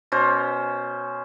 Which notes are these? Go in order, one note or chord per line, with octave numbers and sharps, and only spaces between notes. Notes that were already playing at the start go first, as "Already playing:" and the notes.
B2 C#4 C5